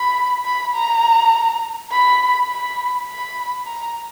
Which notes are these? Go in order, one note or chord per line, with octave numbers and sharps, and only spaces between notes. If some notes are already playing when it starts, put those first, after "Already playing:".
Already playing: B5
B5
A#5
B5
B5
B5
A#5